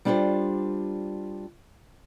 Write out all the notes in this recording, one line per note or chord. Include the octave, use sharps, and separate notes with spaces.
G3 D4 F4 G4 A4 C5